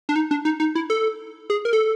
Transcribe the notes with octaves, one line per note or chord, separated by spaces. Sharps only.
D4
D#4
D4
D#4
D#4
E4
A4
G#4
A#4
A4